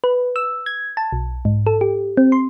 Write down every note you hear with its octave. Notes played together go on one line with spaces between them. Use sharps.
B4
E6
G#6
A5
B1
G#2
A4
G4
C4
C6